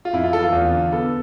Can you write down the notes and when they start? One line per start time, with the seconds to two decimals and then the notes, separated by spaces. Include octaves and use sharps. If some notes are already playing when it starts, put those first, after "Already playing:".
0.05 F4
0.13 F2 E4
0.23 F4
0.33 E3 A4
0.43 F4
0.53 E2
0.73 D3
0.92 B3 A4